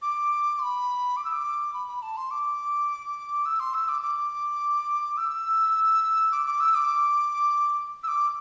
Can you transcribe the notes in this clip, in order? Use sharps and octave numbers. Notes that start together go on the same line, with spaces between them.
D6
C6
B5
D6
E6
D6
B5
B5
A5
C6
D6
E6
C6
E6
D6
D6
E6
D6
D6
E6
D6
E6
D6